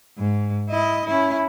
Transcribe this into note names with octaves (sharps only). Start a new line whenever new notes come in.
G#2
E4 D#5
C#4 E4